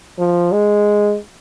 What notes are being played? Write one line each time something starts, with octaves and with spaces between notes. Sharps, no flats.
F3
G#3